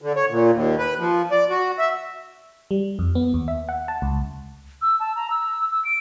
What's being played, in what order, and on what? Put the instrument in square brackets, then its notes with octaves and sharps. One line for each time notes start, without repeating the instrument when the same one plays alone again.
[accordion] D3
C#5
A#2
D#2
B4
F3
D5
F#4
E5
[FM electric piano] G3
F2
B3
D#2
E5
F#5
A5
C#2
[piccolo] E6
A5
A#5
E6
E6
D7